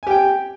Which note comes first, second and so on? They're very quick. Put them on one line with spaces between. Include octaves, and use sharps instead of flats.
G#5 G4 G5